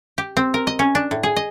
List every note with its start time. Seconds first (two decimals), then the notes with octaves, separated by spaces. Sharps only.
0.18 G4
0.37 C4
0.54 A#4
0.67 D#5
0.79 C#4
0.95 D4
1.11 A2
1.23 G#4
1.36 D#5